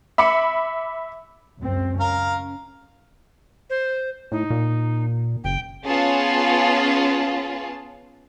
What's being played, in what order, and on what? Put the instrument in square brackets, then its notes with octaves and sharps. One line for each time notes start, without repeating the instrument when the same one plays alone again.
[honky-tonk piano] E5 B5 D6 C#7
[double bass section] C#2 F#2 C4
[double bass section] C#4 [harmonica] A#4 F5
[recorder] C5
[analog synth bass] A2 [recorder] D#4
[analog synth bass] A#2
[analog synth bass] F#1 [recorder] G5
[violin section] B3 C#4 F4 G#4 F5 A5